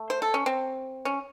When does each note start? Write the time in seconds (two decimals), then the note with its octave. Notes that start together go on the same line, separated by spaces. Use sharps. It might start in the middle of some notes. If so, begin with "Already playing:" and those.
Already playing: A3
0.10 C5
0.22 A4
0.34 C#4
0.46 C4
1.05 C#4